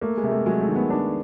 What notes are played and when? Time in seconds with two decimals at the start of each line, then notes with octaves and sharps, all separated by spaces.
0.01 A3 A#3
0.17 G#3
0.24 C3
0.31 A3
0.46 F#3 G#3
0.61 A3
0.68 D#3
0.76 B3
0.90 D4